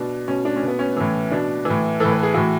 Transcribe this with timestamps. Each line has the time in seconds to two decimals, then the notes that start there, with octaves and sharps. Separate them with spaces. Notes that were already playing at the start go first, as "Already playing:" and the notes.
Already playing: B2 D4
0.28 B2 C#4
0.45 D4
0.56 C#4
0.63 B2
0.68 B3
0.79 C#4
0.97 A2 E3
1.31 B2 D4
1.65 A2 E3
2.00 A2 E3 A4
2.11 B4
2.23 G#4
2.34 A2 E3 F#4